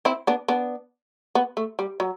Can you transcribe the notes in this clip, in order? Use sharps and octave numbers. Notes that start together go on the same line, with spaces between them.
C4 E4
B3 D4
B3 D4
B3
A3
G3
F#3